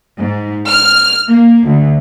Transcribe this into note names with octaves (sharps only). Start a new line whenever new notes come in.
G#2
F6
A#3
D2